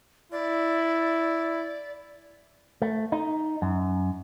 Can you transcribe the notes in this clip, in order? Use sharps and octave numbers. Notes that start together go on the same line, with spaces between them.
E4 D5
A3
D#4
F#2